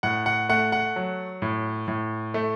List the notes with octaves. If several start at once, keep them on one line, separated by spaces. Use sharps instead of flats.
A2 F#5
F#5
A3 F#5
F#5
F#3
A2
A2
A3